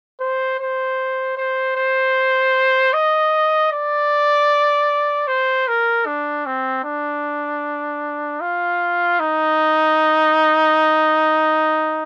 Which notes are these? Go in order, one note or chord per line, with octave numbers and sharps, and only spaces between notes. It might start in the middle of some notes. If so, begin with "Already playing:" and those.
C5
C5
C5
C5
D#5
D5
C5
A#4
D4
C4
D4
F4
D#4